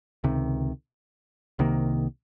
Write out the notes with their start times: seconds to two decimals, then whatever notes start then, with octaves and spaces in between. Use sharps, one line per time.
0.24 C#2 C3 D#3
1.59 C2 C3 D#3 A#3